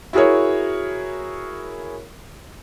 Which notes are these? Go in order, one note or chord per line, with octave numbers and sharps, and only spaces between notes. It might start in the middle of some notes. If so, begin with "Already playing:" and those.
E4 F#4 G#4 A#4 C#5